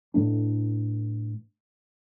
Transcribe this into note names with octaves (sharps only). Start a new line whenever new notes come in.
A2 E3 A3 D4